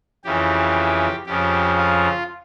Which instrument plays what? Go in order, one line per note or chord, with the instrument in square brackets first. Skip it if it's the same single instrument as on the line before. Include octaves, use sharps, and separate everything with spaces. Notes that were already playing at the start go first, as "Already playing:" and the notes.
[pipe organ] F2 C#3 E3 G4
F2 C#3 F3 G4
F4